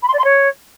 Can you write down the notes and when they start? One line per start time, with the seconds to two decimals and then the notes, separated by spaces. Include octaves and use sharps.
0.02 B5
0.08 C6
0.13 D5
0.19 C6
0.24 C#5